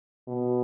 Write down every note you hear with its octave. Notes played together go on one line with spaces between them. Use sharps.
B2